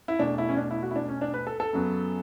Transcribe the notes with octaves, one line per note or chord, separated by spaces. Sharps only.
E4
E2 B2 A3 D4
E4
C#4
D4
E4
F#4
E4
D4
C#4
D4
B4
A4
A4
F#2 C#3 F#3 B3